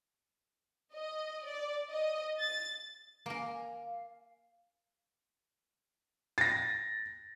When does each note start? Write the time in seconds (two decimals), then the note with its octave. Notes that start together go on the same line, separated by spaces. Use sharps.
0.94 D#5
1.45 D5
1.91 D#5
2.39 A6
3.26 A#3 A#4 G#5
3.84 F5
6.38 A6 A#6